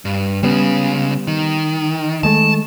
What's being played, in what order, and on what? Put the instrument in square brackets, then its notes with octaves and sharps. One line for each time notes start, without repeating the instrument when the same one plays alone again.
[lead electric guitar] G2
[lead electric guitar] C#2 C#3 [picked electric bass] G3 B3
[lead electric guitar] D#3
[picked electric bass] D#3 G#3 A3 [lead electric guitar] A5